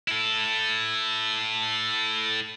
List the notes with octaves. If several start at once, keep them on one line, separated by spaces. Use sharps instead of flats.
E4 A4